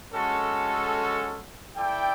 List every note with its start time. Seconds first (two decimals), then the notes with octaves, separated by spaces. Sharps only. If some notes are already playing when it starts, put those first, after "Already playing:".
0.13 G#3 C#4 F#4 A4
1.76 E4 A4 D5 G5